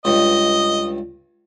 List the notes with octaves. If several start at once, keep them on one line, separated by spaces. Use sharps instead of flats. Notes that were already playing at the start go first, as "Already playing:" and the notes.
C#2 G2 D#5